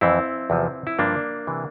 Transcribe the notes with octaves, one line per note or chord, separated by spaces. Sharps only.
F2 E3 C4 E4
E2 C3 F3
E4
G2 F3 A#3 D4
C3 E3